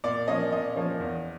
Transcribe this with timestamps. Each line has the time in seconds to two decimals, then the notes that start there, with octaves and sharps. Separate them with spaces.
0.04 A#2 D5
0.28 F3 A#3 C#4 D#5
0.52 A#2 D#5
0.76 F3 A#3 C#4
1.00 E2